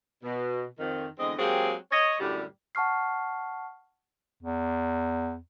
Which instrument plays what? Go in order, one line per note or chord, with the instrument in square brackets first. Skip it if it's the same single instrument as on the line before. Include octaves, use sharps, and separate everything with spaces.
[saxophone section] B2
F2 D#3
E2 D3 G#3 C4 D#5
F#3 G#3 A#3 C4 G4 G#4
C#5 D#5
F#2 A2 D3 G3
[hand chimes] F#5 A5 C#6 F6 C7
[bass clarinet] E2